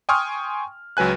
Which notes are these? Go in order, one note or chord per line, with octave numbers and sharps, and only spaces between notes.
G5 G#5 C6 C#6 D#6 F6
C#2 F#3 B4 G#5 F#6